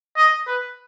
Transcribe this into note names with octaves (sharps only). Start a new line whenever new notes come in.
D#5
B4